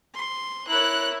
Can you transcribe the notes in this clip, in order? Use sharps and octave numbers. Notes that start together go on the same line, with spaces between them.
C6
E4 A#4 C#5 F#6